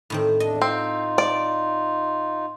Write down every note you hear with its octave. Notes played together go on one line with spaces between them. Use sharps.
A2 D#3 C4
E2 D4 D#5
C4 D#4 F4
D5